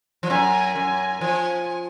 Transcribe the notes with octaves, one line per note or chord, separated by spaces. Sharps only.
F3
F#2 G#5
F#2 G#5
F3 G#5